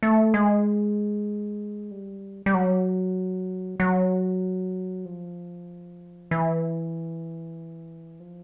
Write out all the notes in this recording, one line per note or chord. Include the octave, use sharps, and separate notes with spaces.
A3
G#3
G3
G3
F#3
F#3
F3
E3
F3